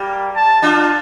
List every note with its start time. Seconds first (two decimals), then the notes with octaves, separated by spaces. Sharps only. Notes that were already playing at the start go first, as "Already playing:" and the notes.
Already playing: G3 A#3
0.36 A5
0.62 D4 F4